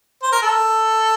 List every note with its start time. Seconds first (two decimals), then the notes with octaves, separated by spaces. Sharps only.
0.23 C5
0.32 A#4
0.42 A4